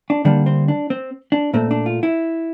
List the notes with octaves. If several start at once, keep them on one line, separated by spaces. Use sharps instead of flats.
D4
D3 G3 A#3 D4
C4
D4
C4
D4
A#2 A3 C4
D4
F4
E4